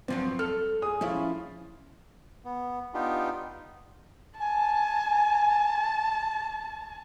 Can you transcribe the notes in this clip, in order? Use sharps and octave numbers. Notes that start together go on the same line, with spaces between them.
G2 F3 F#3 C4
A4 F6
G#4 D#6
F3 C#4 E4 F4
B3
B3 D4 D#4 F4 G4
G#5 A5